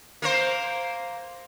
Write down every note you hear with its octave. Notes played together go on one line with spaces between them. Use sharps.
A#3 A#4 C5